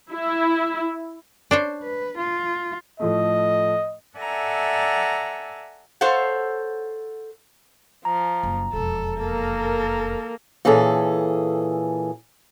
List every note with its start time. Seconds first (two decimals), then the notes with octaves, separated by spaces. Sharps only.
0.11 E4
1.51 D4 C5 C#5
1.83 B4
2.18 F4
3.00 A2 F3 A3 D#5
4.18 A4 D5 E5 F#5 G#5 A#5
6.01 A4 C5 C#5 F5 F#5
8.05 F3 A#5
8.43 F#1
8.73 E1 F2 A4
9.20 A#3 A4 A#4
10.65 A#2 E3 C#4 G#4 A4